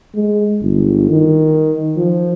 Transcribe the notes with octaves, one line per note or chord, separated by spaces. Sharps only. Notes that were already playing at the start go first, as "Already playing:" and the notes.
G#3
G1
D#3
F3